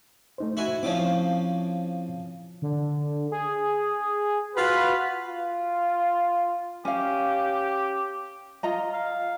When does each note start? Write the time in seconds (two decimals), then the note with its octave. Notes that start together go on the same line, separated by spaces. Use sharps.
0.38 A3 D#4 C5
0.57 E4 F#4 G#5
0.83 C#3 F3 C4 E4 C#5 D6
2.62 D3
3.32 G#4
4.55 F4 F#4 B4
5.27 F4
6.85 C#4 G4 F5
8.63 F4 D#5 A#5
8.94 F5